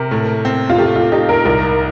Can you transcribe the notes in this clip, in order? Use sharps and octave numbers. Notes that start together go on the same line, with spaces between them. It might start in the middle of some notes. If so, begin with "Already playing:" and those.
Already playing: C3 A#4
A2
C4
F4
A3 G4
F4
D#4 G4
A#4
C2 A#4